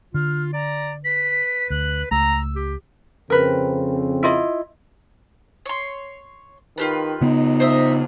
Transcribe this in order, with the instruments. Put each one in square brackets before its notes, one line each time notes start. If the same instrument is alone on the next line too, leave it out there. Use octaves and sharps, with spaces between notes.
[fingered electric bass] D3 [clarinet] F4 [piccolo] F6
[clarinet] D5 [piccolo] A#5
[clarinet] B4 [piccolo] B6
[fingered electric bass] D2 [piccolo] F#6
[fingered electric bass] C#2 A3 [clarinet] A#5 [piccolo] E6
[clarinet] G4
[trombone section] F2 C#3 C4 [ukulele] A#4 B4
[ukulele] E4 F4 D#5
[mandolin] C#5 C6
[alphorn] D#3 [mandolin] F4 G4 B4
[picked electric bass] C#3 B3 [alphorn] D#4
[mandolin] C5 D#5 E5